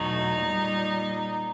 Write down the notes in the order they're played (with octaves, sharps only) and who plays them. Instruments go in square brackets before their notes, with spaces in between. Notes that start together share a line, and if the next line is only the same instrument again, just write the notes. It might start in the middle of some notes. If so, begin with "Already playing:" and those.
Already playing: [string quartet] E2 B2 F#3 A3 D#4
A#2 G3